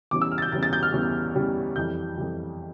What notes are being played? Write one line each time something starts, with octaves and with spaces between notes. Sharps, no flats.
E2 E3 G3 C#4 D6
E6
F6
A6
G6
E2 E3 G3 C#4 A6
A6
G6
F6
E2 E3 G3 C#4
E2 E3 G3 C#4
F2 E3 G3 G6
F2 E3 G3